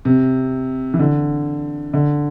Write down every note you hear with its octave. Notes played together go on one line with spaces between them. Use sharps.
C3
E3
D3
D3